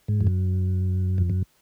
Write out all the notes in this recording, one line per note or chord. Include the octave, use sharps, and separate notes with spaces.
G#2
F2
F#2
F2
F#2